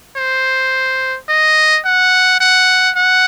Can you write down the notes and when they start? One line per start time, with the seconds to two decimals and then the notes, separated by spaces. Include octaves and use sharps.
0.17 C5
1.29 D#5
1.85 F#5
2.40 F#5
2.97 F#5